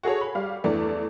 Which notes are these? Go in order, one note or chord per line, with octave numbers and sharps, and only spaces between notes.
F#4 G#4 A4 C#5
B5
G3 F5
E2 E3 A3 D4